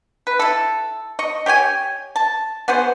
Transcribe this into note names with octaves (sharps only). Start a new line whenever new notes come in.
B4
E4 A4
D#5 C#6
G4 C#5 G5 G#5
A5
B3 F#4 G#4 C5